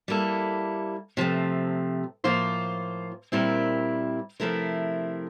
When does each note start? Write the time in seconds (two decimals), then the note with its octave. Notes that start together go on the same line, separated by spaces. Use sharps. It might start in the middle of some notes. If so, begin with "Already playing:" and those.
0.08 G3 A#3 E4 A4
1.17 C3 F3 A3
2.24 A2 F3 A#3 F4 C5
3.32 A#2 G3 C4 E4 A#4
4.40 C3 F3 A3 E4 A#4